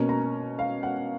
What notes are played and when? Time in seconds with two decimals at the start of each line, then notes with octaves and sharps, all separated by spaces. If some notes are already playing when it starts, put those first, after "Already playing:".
Already playing: B2 A#3 C#4
0.09 A#5
0.59 F5
0.83 F#5